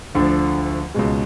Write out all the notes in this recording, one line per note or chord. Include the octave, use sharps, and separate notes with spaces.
D2 D3 F3
C#2 B2 G#3